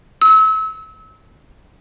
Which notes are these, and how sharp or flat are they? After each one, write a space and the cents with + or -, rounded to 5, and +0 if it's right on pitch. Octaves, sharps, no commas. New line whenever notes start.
E6 -30